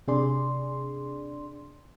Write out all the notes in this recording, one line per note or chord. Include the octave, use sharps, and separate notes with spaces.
C3 D4 G#4 D5 C6